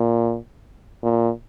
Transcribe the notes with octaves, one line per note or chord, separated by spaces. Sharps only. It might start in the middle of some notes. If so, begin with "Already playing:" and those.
Already playing: A#2
A#2